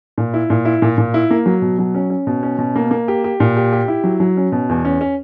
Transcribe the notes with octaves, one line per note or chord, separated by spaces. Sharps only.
A#2
E4
A#2
E4
A#2
A#2
E4
A#3
F#3
B2
F#3
C#4
C#4
B2
C#4
B2
A#3
A#3
G4
G4
A#2
G4
G4
E4
F#3
F#3
C#4
B2
E2
C#4
C#4